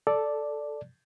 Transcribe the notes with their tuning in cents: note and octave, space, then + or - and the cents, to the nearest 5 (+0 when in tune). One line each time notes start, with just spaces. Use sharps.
A4 +0 D5 +0